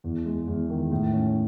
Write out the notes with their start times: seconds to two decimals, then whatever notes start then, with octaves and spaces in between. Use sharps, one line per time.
0.04 E2
0.25 G#3
0.47 E2
0.70 D#3
0.92 A2
1.13 C#4